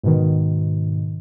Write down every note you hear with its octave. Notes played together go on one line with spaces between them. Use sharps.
G#2 B2 D#3